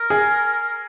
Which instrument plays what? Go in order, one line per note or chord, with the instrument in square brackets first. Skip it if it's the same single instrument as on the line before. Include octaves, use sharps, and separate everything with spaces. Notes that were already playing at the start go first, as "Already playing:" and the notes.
Already playing: [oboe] A#4
[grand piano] G#4